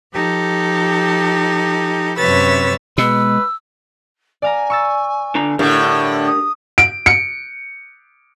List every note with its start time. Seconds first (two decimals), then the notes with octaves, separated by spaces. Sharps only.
0.13 F3 D#4 G4 A4
2.18 F#2 C3 B4 C#5 E6 A6
2.98 B2 G#3 B4 E6
4.42 D5 F5 G#5 A#5
4.70 C#6 E6 A6
5.35 D3 D4 A#5
5.59 A2 D3 D4 G4 A#4
6.26 D#6
6.78 D7
7.06 C#7